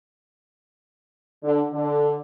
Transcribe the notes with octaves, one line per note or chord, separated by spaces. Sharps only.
D3
D3